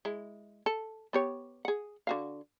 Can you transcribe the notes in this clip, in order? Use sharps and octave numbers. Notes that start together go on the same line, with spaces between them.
G#3 E4
A4
B3 G4 C#5
G#4 F#5
D3 F#4 F5